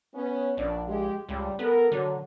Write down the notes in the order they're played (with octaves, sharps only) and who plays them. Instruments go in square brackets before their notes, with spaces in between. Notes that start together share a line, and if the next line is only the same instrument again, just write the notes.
[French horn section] B3 C#4
[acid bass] A#1 [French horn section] D4 D5
[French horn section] G#3 G4
[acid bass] C#2 [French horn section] G3
[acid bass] B3 [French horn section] A4 A#4
[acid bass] D3 [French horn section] F#3